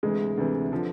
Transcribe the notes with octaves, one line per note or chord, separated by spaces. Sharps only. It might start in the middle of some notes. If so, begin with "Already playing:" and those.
D2 C3 E3 G#3
D2 C3 E3
D3 F3